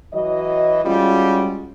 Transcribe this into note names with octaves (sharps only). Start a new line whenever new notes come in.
E3 F#3 D#5
G3 G#3 C#4 F4 F#4